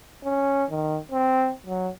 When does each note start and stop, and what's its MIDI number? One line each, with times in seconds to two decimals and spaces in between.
0.24 0.65 61
0.71 0.99 51
1.12 1.51 60
1.67 1.89 54